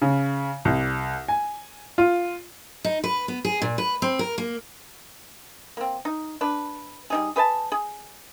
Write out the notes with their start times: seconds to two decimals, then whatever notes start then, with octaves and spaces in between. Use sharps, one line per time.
0.02 C#3
0.65 C2
1.28 G#5
1.98 F4
2.84 D#4
3.04 B4
3.28 B3
3.45 G#4
3.62 A#2
3.78 B4
4.02 C4
4.19 A#4
4.38 A#3
5.77 A#3 C4
6.05 D#4
6.41 D4 B4
7.10 G3 D#4 G#4
7.36 G#4 B4 G5 A5
7.72 G#4